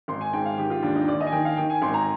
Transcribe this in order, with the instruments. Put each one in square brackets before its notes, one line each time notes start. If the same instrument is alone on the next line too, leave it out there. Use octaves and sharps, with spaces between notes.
[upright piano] G#1 C6
G#5
G#2 G5
F5
D#3 G4
F4
D#2 D4
D#4
D#2 D5
D#5
G#5
D#3 G5
F5
D#3 G5
G#5
G#1 C6
A#5